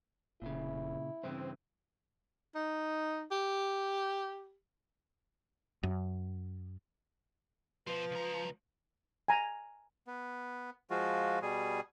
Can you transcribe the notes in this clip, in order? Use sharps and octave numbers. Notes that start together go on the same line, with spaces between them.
F1 A#2 C#3 E4
G2 C#3 E3 C4
D#4
G4
F#2
B2 F3 B4 C5
C#2 A#5
G#5 A#5
B3
F3 G#3 F4 F#4
B2 G3 G#4